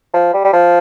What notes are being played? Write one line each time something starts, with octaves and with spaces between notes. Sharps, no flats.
F3
G3
G3
F3